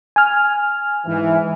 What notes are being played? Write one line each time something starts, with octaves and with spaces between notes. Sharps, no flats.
G#5 F6
G#2 E3